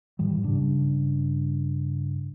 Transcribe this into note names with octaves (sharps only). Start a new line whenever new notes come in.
G#2 D#3 E3 G3
G2 C#3 D4